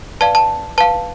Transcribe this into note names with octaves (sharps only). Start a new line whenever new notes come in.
B4 D5 F5 A5
A5
B4 F5 A5